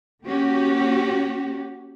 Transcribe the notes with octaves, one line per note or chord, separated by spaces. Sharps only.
A#3 C#4 F#4 G4